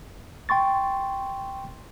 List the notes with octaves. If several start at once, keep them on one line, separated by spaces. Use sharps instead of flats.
G5 C6 C#6 A6